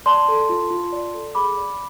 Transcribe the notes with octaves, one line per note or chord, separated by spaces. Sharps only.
D5 A5 C6
A4
F4
F4
D5
A4
G#4 B5 D6
D5